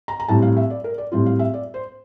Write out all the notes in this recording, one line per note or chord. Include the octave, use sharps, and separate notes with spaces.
A#5
A#5
A2 G3 C4 A5
F5
E5
D5
A#4
D5
A2 G3 C4 F4
F5
E5
D5
C5